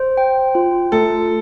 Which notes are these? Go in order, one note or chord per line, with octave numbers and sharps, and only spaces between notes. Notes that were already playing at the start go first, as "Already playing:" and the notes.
Already playing: C5
G5
F4
A3 A4